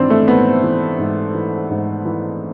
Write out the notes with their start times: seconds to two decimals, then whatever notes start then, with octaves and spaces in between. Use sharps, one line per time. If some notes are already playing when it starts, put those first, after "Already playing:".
Already playing: G#2 E3 C4 D4 E4
0.10 A3
0.28 G#2 B3
0.63 E3
0.99 G#2
1.34 E3
1.70 G#2
2.05 E3